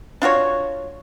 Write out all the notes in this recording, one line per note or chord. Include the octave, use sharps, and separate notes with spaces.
D4 F4 F#4 C#5